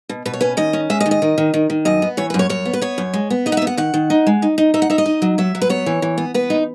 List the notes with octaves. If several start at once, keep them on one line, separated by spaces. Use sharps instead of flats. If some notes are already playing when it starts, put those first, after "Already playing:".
B2
B2 B4
C#5
C#4 B4
D#3 D#5
C#4
G#3 E5
D#5
D#3
D#5
D#3
D#3
D#3
D#3
F#2 D#5
B3
E3 C#5
B4
F#2
C#5
F#2 C#5
B3
B4
B3 C#5
F#2
G#3
B3
D#4 D#5
F#5
E5
B3
F#5
D#3 F#5
D#3
D#4
G#3
D#4
D#4
D#4 E5
F#5
D#4 E5
D#5
D#4
F#3
F#3 E5
F#3
B4
B3 C#5
E3
E3
B3
B3 B4
D#4